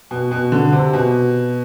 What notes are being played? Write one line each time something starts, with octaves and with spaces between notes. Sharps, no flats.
B2
B2
D3
C3
B2